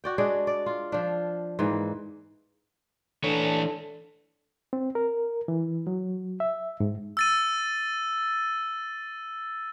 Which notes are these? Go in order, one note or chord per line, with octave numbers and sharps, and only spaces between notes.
F#4 D5 G5
G#3 D4 G#4 D5
D5
F4
F3 D4
G#2 E3 A#3
E3 D4 A4 C#5
C4
A#4
E3
F#3
E5
G#2
E6 A6 D#7